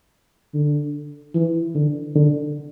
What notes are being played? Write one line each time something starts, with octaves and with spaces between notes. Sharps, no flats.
D3
E3
D3
D3